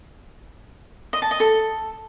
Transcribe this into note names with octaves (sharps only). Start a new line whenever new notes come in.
D#5
A5
D#5
A4